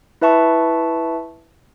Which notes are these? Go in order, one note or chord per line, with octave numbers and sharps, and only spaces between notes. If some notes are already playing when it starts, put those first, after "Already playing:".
E4 B4 E5 A5 C#6